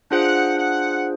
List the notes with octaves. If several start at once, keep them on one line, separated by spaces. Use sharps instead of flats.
D4 F4 G#4 C5 F#5
F#5